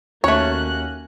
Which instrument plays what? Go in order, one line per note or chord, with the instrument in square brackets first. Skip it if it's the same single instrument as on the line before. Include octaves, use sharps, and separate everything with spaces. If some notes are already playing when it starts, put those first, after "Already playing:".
[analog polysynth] D#2 C#4 F#4 [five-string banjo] A3 C#5 [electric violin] A#3 F#6